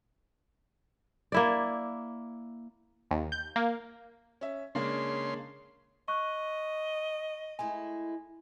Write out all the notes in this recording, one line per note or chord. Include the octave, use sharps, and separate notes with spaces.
A#3 E4 D5
D#2
G6
A#3
C#4 E5
C#3 G#3 A#3 D4 C6
D#5 C#6 F#6
G#3 A3 E4 G#5